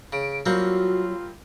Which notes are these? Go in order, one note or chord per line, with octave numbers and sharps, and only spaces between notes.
C#3 D7
F#3 G3 A#3 C4 F4 F#4